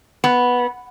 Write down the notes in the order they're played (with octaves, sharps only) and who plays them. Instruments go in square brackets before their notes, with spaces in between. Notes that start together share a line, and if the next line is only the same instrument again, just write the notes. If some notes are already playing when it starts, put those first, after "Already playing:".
[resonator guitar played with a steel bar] B3